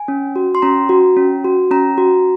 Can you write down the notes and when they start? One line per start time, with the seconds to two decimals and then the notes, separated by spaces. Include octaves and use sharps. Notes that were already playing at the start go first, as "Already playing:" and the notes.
Already playing: G#5
0.08 C#4
0.36 F#4
0.55 C6
0.62 C#4 A#5
0.89 F#4
1.17 C#4
1.44 F#4
1.71 C#4 A#5
1.98 F#4